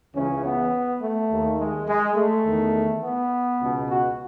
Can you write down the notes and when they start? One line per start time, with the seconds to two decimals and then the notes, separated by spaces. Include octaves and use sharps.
0.15 C#2 C#3 E3 C#4
0.43 B3
1.01 A3
1.29 D#2 D#3
1.58 G#3
1.87 G#3
2.15 A3
2.45 E2 D#3
3.02 B3
3.59 C#2 B2
3.89 F#4